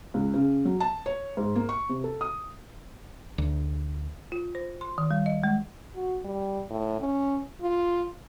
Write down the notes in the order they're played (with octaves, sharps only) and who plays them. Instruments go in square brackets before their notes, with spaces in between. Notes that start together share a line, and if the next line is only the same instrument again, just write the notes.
[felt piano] C#2
C#3
F#3
A5
C#5
G#2
A#3
C#6
C3
A4
D#6
[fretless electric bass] D2
[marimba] F4
C5
C6
D#3
G3
D#5
G#3
[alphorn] F#4
G3
A2
C#4
F4